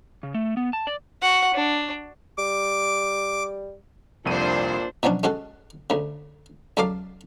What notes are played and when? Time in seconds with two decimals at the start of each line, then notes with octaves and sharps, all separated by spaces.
0.23 C#3
0.35 A3
0.57 B3
0.73 A5
0.87 D5
1.22 F#4 F#5
1.54 D4
2.38 G3 D6
4.25 C2 F2 A#2 D4 A4 C5 D#7
5.03 B2 F3 F#3 C#4 D4
5.23 G#3 C#4 F#4 A4
5.90 D2 C#3
6.77 C#2 F#3 A4 D5 F5 D6